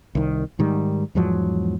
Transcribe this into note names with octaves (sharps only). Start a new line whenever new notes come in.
C2 D#3
G#2 D#3 G3
E2 G#2 F3 F#3